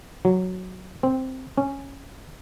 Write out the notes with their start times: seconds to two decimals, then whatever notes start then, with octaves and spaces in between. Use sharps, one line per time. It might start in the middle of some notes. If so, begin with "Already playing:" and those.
0.25 F#3
1.03 C4
1.58 C#4